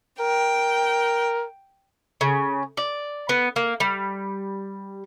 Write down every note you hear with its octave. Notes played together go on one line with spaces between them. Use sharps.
A#4 G5
C#3
D5
B3
A#3
G3